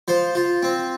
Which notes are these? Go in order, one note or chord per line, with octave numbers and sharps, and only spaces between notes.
F3 C5
F4
C4